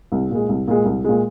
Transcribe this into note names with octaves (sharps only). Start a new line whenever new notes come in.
C2
A#2 G#3
C2
A#2 G#3
C2
A#2 G#3